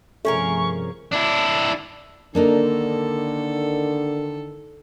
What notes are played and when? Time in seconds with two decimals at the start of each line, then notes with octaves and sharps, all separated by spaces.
0.25 G2 C3 F3 A3 C#4 G#4 A#4 C#6
1.12 D4 E4
2.35 D3 D#3 A#3 D4 D#4 A4